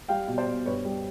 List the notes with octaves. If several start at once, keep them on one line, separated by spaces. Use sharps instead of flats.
G3 F5 G5
B2
C5 D5
B2
G2 B4 C#5
G3